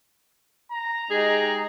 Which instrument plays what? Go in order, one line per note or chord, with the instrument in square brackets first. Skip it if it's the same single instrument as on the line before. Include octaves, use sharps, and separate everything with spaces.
[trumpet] A#5
[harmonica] G#3 D#4 G4 [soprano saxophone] G#4